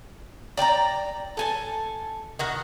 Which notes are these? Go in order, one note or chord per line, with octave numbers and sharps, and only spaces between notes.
D5 G5 G#5 A#5
A4 G#5 A5
D#3 F#4 F#5